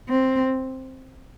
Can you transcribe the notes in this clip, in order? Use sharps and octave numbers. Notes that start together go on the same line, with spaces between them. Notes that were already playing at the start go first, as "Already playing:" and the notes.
C4